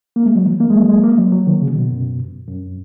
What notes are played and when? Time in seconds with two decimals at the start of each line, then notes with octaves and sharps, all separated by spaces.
0.16 A#3
0.26 G#3
0.35 F#3
0.46 E3
0.60 A#3
0.70 G#3
0.81 F#3
0.91 G#3
1.04 A#3
1.18 F#3
1.32 F#3
1.47 D#3
1.62 C#3
1.75 B2
1.91 F#2
2.48 F#2